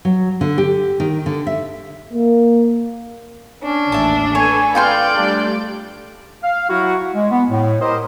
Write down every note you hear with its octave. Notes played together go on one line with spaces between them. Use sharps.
F#3
D3
G4
D#3
D3
E5
A#3
C#4 D4
A1 D#2 E5 A5
A4 B4 C#5 G#5
F4 D5 F5 G5 C6 G6
G3 A3 D4
F5
F#3 E4 F#4
G#3
B3
A2
G4 A#4 C5 D#5